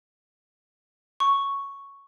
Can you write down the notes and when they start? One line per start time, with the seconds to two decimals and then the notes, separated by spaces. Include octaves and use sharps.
1.20 C#6